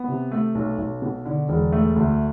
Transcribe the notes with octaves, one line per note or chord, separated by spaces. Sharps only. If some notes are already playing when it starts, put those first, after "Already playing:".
Already playing: B3
C3
A3
B1
B1
B2
D3
E1
A3
D2